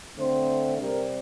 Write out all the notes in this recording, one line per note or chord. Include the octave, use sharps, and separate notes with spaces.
D3 A3 C4 C5
C3 G3 C4 A#4